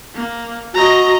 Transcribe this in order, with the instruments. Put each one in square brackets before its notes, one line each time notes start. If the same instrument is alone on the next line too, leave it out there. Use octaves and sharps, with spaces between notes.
[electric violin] A#3
[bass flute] F#4 [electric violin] D#5 A#5